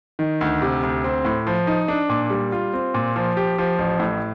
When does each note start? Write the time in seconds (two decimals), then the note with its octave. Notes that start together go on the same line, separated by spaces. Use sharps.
0.19 D#3
0.41 D2
0.62 C3
0.83 D2
1.04 C4
1.25 A2
1.47 F3
1.67 D#4
1.88 D4
2.09 A#2
2.30 G3
2.52 F4
2.73 C4
2.94 A#2
3.16 F3
3.37 G4
3.58 F3
3.79 A1
4.00 A2